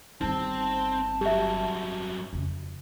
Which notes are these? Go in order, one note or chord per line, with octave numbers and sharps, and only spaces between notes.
G1 D#3 C4 D#4 A5
G2 F#3 G4 E5
F2 C#3